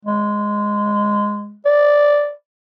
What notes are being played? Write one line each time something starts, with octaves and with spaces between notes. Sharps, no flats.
G#3
D5